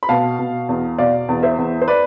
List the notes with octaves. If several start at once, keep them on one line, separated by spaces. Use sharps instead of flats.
B5
B2 F5 A5
B2
E2
B2 D5 F5
E2
C5 E5
E2
C5
B4 D5